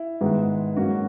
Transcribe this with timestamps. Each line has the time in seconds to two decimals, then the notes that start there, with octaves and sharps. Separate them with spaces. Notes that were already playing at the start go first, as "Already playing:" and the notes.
Already playing: E4
0.21 G#2 D#3 G#3 B3
0.76 G#2 F#3 A#3 C#4 F#4